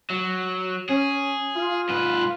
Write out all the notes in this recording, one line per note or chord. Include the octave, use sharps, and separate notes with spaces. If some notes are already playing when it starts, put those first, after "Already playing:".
F#3
C#4 G#4
F4
G#2 B4